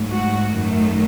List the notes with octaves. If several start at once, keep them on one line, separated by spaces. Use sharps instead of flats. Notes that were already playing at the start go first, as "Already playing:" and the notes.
Already playing: G#2 F#3 A3
F#4
F#2 D#3 A3